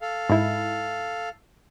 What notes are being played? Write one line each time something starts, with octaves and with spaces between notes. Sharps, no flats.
A4 F5
G#2 E4